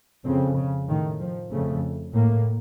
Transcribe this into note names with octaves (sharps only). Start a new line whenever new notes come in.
F2 C#3 C4
C#3
A2 D#3
F3
F2 C#3 A3
A2 A#3